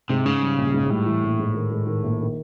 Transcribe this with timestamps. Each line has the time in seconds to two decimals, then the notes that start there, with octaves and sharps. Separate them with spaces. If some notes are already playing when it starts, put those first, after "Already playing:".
0.10 G#2 C3
0.26 G#2 C#3
0.42 G3
0.58 A#1
0.74 G#2
0.90 A2 G3
1.06 E3
1.23 A#1
1.39 G#2
1.54 D#3
1.71 G#2
1.87 D#3
2.04 A#1
2.19 D#3